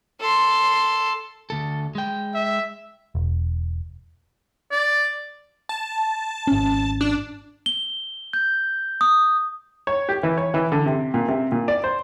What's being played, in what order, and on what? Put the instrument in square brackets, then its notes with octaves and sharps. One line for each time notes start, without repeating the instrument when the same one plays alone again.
[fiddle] A4 C6
[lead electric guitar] D2 A4
G#3 G5
[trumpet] E5
[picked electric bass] E1
[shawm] D5
[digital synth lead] A5
[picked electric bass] G#1 C#4
[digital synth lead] D4
[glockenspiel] G7
G6
D#6
[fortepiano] C#5
G4
E3
C#5
E3
D3
C3
A#2
C3
A#2
D5
C5